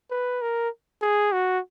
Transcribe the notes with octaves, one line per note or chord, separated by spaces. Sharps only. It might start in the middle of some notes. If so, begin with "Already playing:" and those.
B4
A#4
G#4
F#4